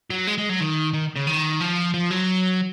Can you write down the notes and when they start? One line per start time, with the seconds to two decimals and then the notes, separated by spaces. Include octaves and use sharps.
0.10 F#3
0.27 G#3
0.38 G#3
0.49 F#3
0.61 D#3
0.93 D#3
1.16 C#3
1.27 D#3
1.60 F3
1.94 F3
2.11 F#3